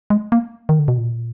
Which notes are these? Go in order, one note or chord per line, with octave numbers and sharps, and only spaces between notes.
G#3
A#3
D#3
D3
B2
A#2